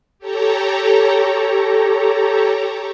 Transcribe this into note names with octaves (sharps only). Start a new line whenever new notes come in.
G4 A4 C#5 A#5